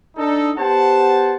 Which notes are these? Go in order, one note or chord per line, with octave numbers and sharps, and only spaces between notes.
D4 D#4 A4
B3 G4 C5 F#5 A5